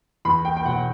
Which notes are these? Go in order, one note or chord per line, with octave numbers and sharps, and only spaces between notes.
E2 B5
G5
G5
B2 F#3 F#5